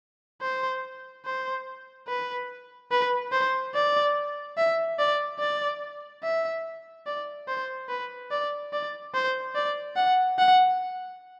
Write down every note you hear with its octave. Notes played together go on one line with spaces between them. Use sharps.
C5
C5
B4
B4
C5
D5
E5
D5
D5
E5
D5
C5
B4
D5
D5
C5
D5
F#5
F#5